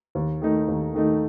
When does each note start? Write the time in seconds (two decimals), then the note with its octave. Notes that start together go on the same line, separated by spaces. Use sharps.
0.15 D#2
0.41 D#3 A3 D#4
0.68 D#2
0.94 D#3 A3 D#4